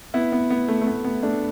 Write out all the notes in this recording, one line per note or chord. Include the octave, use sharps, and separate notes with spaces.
B3 E4
B3
B3
A3
A3
B3
B3
A3 D4